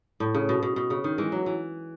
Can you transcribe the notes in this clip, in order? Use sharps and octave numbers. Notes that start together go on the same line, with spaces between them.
A2
C#3
B2
B2
B2
C#3
D#3
E3 G#3
F#3
E3